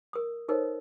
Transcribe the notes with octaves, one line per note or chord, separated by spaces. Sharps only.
A#4 D#6
D#4 A4 A#4 C5 C#5 D#5